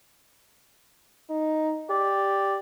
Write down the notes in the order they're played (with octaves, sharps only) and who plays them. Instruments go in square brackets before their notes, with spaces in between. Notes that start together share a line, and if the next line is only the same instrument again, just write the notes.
[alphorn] D#4
[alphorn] G4 [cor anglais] D5